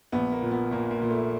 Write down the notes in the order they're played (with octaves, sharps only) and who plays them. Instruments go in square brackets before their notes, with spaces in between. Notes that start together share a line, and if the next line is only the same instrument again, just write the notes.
[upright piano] A#1 B3
A#3
A#2
B3
A#2 A#3
A#3
A#2
A3